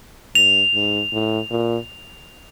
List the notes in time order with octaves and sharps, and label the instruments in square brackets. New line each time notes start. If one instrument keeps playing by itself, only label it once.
[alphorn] G2 [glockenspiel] F7
[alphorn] G#2
A2
A#2